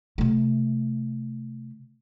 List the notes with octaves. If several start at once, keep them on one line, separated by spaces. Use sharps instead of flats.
C3 A3